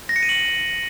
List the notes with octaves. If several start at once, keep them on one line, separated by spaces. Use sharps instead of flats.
A#6
C#7
D#7
F#7